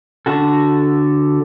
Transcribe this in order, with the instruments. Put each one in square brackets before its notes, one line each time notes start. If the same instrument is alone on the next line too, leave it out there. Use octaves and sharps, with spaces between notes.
[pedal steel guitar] D3 F#4 A4